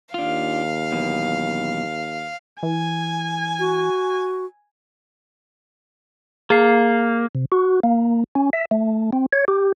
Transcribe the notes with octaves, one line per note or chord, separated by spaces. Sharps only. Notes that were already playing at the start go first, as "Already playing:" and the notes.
D#2 D4 F4 F5
F#2 B2 E3
E3 G#5
F#4
A#3 G#4 C7
C3
F#4
A#3
C#4
E5
A3
C4
C#5
G4